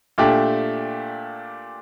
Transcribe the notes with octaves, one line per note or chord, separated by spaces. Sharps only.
A#2 A3 D4 G4